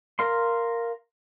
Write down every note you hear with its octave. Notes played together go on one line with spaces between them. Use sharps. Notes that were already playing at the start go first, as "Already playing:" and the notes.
A#4 F5 C6